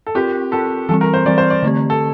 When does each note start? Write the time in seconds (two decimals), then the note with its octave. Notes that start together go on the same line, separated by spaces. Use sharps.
0.07 A4
0.15 C4 F4 G4 A#4
0.52 C4 F4 A4 A#4
0.89 E3 G3 C4 A4
1.01 A#4
1.14 C5
1.26 E3 G3 C4 D5
1.38 C5
1.50 D5
1.63 D3 A3 C4 G4
1.90 A4